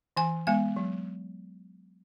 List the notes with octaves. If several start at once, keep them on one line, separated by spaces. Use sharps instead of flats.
E3 G#5
G#3 B3 G#5
F#3